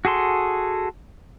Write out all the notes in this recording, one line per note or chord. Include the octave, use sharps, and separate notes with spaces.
F#4 G#4 A4 C6